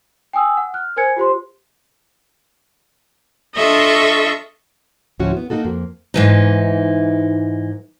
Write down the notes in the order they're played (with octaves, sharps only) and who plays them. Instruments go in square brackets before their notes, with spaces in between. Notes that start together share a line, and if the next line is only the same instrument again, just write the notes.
[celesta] G5 G#5 D#6 E6
F#5
F6 F#6
A#4 C5 G#5 G#6 C#7
F4 G4 C5 C6
[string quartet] D4 F4 A4 D#5 E5 C#6
[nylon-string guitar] D2 A2 F3 C#4 F#4
B3
A#3 D#4 F#4 A4
F2 A#3
[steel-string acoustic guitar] G#2 E3 D#4